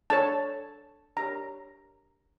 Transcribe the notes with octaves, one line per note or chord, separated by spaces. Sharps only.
D4 A4 C#5 A5
D4 G4 A#4 C#5 A#5